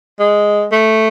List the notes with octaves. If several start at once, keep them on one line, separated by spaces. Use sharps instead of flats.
G#3
A3